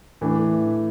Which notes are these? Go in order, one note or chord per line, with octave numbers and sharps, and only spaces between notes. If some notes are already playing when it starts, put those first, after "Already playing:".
A2 E3 A3 D4